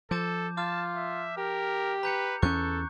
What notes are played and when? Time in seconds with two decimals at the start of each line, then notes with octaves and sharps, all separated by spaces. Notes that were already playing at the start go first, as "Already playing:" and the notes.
0.11 F3 A4 A5 D6 G6
0.57 F4 A5 D6 F6
0.96 E5
1.37 G4 A#4
2.03 B4 A#5 G6 C#7
2.42 E2 C#4 A4 C#6 F#6 G6